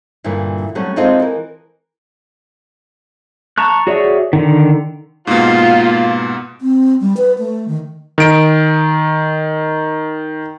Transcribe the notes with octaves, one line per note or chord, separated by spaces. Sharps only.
G2 A#2 D3 E3
F#3 G3 A3 C#4
G#3 C4 D#4 F4 A4 D#5
E3 A#4
A5 A#5 C#6 F#6
F#4 G#4 C#5 D5 E5
D3 D#3
G#2 B2 A#3 F4
C4
G3
B4
A3
D#3
D#3 D7